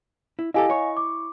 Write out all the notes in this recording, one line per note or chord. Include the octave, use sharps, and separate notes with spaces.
E4
E4 G4 A4 D#5 F5 G#5
E4 C#5 C#6
D6